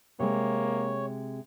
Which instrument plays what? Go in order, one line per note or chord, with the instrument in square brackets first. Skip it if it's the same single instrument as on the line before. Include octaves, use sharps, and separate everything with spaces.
[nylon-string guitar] C3 G#3 [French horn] A#3 [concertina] C#5